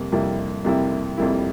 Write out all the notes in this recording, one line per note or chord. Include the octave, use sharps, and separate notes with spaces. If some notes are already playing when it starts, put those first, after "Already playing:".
Already playing: F2 C3 G3 A#3
F2 C3 G3 A#3 E4
F2 C3 G3 A#3 E4
F2 C3 G3 A#3 E4